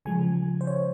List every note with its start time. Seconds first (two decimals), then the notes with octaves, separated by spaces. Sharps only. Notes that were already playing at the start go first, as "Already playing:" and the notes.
0.05 C#3 F3 G#3 G#5
0.61 C5
0.67 C#5